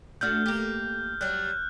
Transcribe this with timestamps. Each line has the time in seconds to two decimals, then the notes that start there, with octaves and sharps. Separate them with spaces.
0.21 A3 D4 F#4 F6 G6
0.46 A#3 G4
1.21 F#3 G3 F#6